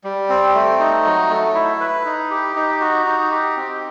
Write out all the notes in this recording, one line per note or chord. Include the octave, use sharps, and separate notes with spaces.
G3
C4
A3
D#4
F#3
A3
E4
B4
D#4
G4
D#4
F#4
D#4
G4
C4